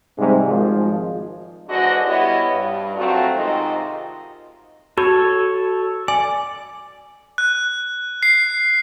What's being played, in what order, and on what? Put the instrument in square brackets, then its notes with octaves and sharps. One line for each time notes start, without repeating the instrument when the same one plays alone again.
[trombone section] G#2 C3 G3
G#1 F3 G#3
[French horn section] G#2 D3 E3 D4 F#4 D#5
G3 B3 E4 G4 C#5 D#5
G2
F#3 A3 C4 F4 F#4
G#2 C3 D#3 D#4 F4 D#5
[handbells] F#4 [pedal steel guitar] A4 C#5
[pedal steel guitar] D5 [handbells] G#5
[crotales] F#6
C7